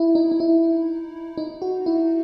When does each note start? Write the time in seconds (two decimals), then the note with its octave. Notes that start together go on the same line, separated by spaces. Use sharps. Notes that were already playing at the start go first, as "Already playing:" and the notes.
Already playing: E4
0.15 D#4
0.31 D#4
0.40 E4
1.38 D#4
1.62 F#4
1.86 E4